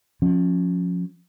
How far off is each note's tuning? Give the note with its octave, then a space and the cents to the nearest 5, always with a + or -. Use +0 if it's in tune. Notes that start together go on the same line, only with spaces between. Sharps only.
F3 +30 C#4 -5